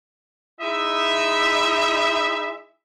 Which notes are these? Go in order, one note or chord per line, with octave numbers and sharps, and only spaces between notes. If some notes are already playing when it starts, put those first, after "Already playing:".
G#3 D#4 E4 D#5 E5